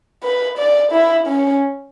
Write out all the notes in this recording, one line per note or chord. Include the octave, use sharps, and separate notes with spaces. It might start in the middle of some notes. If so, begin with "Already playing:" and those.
B4
D5
E4
C#4